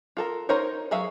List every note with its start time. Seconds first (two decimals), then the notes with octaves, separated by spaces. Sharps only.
0.17 F4 A4 A#4
0.49 D#4 F4 A#4 C5 C#5
0.91 F#3 G#4 E5 F5